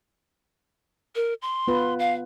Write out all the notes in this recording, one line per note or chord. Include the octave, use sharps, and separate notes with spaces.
A#4
C6
B3 F4 B4
F5